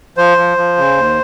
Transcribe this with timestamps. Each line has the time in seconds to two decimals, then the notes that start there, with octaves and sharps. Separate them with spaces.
0.17 F3 C5
0.38 F3
0.58 F3
0.77 C#3
0.97 D#2